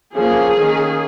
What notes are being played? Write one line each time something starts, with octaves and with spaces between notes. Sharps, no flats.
F3 A#3 C#4 G#4
D#3 A#3 C#4